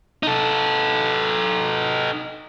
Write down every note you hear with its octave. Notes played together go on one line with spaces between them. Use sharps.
D#4 A4